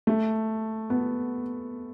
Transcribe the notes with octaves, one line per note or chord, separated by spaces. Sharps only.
A3
B3